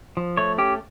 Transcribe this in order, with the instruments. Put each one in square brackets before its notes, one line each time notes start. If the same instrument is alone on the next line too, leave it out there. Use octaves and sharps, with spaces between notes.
[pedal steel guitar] F3
A3 C#5
C#4 G4